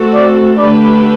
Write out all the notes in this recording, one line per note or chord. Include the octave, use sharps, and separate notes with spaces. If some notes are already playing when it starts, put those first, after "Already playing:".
Already playing: A3 C4 F#4 A4
D5
D3 A3 D4 G4 B4 D5